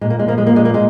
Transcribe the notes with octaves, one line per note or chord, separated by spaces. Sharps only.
A#2 G#3
A#3
G#3
F3 A#3
G#3
A#3
A#2 G#3
A#3
G#3